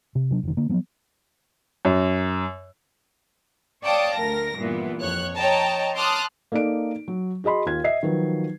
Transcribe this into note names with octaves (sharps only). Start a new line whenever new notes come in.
C3
C3 F#3 D4
F1 D#3
D3 A#3
F3 F#3 B3
F#2
C#5 D5 F5 G5 A5 D#6
D2 A#4 A#6
G2 A#2 E3 B3
F2 C#5 F#6
C#5 D#5 G5 A5 A#5
A5 C6 D6 D#6 F6 F#6
A#3 D#4 A4 D5 D7
F#3
F#4 G#4 D#5 B5 C6
D#2 F4 G#6
D#5 E5 C7
D#3 F3 F#3 B4